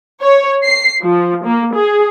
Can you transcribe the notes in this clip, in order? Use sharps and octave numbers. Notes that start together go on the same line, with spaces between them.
C#5
C7
F3
A#3
G#4